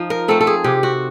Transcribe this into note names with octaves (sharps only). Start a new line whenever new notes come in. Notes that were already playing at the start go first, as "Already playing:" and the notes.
Already playing: F3 D#4
A#4
A3 C4 A4
A4
G#4
C3 G4
F#4